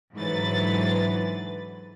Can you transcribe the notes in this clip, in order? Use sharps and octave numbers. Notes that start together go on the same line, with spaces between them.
G#2 D3 E3 F#3 B4 A6